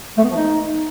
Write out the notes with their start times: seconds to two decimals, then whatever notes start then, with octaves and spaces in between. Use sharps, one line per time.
0.17 A3
0.23 B3
0.29 F3
0.36 D#4